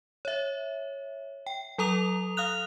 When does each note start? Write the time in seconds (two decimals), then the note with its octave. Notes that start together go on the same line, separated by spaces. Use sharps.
0.25 C#5 E5
1.47 G5
1.78 F#3 A4 A#5 D#6 F7
2.37 F5 D#6 F6 F#6 F7